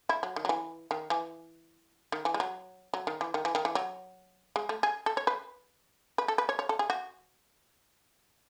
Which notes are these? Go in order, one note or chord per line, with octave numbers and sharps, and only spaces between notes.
E4
F#3
D#3
F#3
E3
D#3
E3
D#3
E3
G#3
F#3
F#3
D#3
E3
D#3
E3
D#3
E3
F#3
G#3
A3
G#4
A4
C#5
B4
B4
A4
B4
C#5
C#5
A4
G#4
F#4